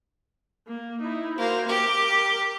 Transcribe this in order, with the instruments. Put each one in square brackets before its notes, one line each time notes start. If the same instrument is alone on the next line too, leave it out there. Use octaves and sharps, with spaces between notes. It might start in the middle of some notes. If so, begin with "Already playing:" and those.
[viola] A#3
D#4 E4
[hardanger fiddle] A#3 [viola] F#4 C5
[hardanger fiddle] G4 [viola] A#4 D6